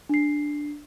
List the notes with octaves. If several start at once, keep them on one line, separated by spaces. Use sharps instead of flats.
D4 C7